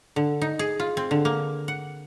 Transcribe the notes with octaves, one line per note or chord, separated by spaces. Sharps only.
D3
D#4
G#4
F4
C4
D3
A#3
F#5